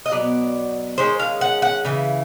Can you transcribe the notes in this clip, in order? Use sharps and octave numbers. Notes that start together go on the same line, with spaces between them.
D#5
B2 F#3 B3 D5
D#3 G#3 C#4 C5
F5
F#5
F#5
C#3 E3